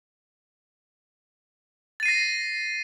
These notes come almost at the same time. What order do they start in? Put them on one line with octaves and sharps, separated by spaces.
A6 D#7 C7 A#6